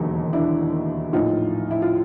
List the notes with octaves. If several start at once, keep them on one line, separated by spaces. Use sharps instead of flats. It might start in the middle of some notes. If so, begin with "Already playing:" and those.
Already playing: E1 D#2 D3 F#3 D#4
D4 E4
A#1 A2 F3 D#4 F4
E4
F4